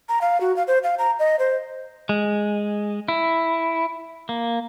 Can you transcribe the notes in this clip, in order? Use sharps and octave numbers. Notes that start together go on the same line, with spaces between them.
A#5
F5
F#4
F5
C5
F5
A#5
D#5
C5
G#3
E4
A#3